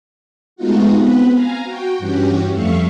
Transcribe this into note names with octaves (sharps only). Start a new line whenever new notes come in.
G#3 A3 B3 D#4 F4 F#4
B3 C4 B4
F5 G#5 A#5
F#4 G5
G2 E3 C#4 F#4 G4
F2 G3 A3 E5 F5 C#6